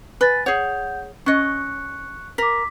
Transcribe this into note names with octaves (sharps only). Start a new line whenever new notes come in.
B4 G#5 A6
G#4 C#5 F#5 G6
C#4 D#5 C#6 F#6 C#7
A#4 D6 B6